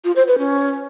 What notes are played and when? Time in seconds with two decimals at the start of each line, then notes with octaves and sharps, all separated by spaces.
0.05 F4
0.16 C5
0.27 B4
0.38 C#4